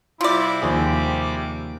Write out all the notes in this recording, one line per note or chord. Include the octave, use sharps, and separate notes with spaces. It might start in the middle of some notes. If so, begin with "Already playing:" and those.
C3 G3 E4 F4 D5 D6
D#2 F3 G4 G#4